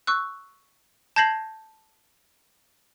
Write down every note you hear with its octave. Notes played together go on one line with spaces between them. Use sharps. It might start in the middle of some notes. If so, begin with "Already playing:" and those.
C#6 E6 F#6
A5 G6 G#6 A#6 C7 F#7